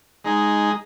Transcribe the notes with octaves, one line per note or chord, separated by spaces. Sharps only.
G#3 D#4 G#4